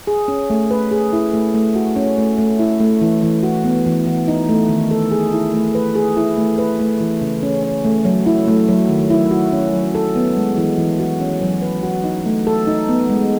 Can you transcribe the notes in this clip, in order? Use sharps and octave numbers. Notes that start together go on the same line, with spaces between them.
G#4
C#4
A3
B4
G#4
E4
A3
A3
F#4
C#4
A3
A3
E4
A3
E3
E3
F#4
B3
E3
E3
D#4
A3
D#3
A4
G#4
E4
A3
B4
G#4
E4
A3
B4
A3
E3
C#3
C#4
C#4
A3
F#3
E4
A3
F#3
D#3
E4
F#4
C#4
F#3
A4
B3
G#3
E3
E3
F#4
C#4
F#3
B4
F#4
D#4
A3
A4
D#4
B3
G#3